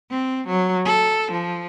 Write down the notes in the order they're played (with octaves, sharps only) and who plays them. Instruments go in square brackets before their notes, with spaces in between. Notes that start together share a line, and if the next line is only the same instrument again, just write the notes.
[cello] C4
F#3
A4
F3